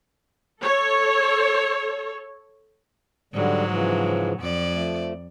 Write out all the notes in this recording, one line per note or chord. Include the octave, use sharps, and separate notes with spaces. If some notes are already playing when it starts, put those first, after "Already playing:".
A4 C#5
G#2 D3 F#3 G3
C#3 E3 F3
F2 D5
F3 A3